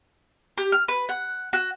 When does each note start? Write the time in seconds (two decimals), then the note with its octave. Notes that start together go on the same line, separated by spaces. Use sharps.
0.58 G4
0.72 F6
0.88 B4
1.09 F#5
1.53 F#4